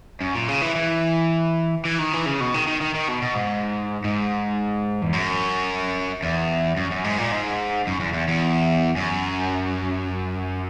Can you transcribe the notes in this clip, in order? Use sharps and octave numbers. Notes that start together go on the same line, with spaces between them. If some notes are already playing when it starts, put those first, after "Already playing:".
F#2
A#2
C#3
E3
E3
E3
D#3
E3
C#3
B2
D#3
D#3
D#3
D#3
B2
B2
G#2
G#2
E2
F#2
E2
F#2
F#2
G#2
A#2
G#2
F#2
E2
E2
E2
F#2